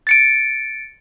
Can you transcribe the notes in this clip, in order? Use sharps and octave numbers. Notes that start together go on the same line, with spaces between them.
A6 C#7 D7